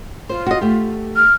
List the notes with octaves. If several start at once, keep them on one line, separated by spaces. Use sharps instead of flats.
F4 C5
F#4 D#5
A3 G4
F6